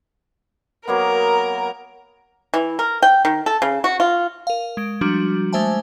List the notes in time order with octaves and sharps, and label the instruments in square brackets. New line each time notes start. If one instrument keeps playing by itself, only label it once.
[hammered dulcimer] F#3 A#3 B3 [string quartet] A#4
[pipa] E3
A#4
G5
D#3
A4
C#3
F#4
F4
[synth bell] A#4 F5
G#3 D7
F3 G3 D4 F#4
G#3 A3 C5 E5 G#5 A5